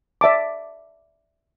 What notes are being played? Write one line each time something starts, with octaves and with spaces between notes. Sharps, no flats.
D5 E5 A5 D6